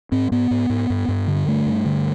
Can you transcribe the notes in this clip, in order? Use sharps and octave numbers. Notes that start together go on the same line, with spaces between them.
G#2 C4
G#2 B3
G#2
G#2
G2
G2
D3
G2 A3
G2
D3